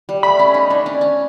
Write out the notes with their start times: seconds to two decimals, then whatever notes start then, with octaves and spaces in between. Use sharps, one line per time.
0.09 G3
0.23 A3 B5
0.39 C#4
0.54 D#4
0.70 D4
0.86 C#4
1.01 C#4